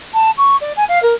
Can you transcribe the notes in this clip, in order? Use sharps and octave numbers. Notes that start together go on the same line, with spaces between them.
A5
C#6
D5
G#5
F5
A#4